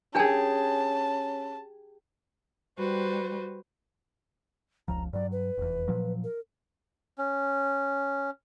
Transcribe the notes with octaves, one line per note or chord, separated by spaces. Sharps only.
C#4 D4 G4 G#4 A#4 G#5 A5
G3 F#4 B4 C5
F1 C#2 F3 A#5
G2 F#3 D5
B4
F1 E2
A#2 F3 F#3
A#4
C#4